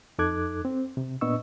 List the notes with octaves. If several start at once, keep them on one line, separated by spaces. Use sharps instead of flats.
F2 D#4 A4 D6 F#6 G#6
C4
C3
A#2 B3 D4 D#5 C#6 E6